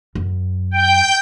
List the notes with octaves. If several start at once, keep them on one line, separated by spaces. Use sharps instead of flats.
F#2
G5 G6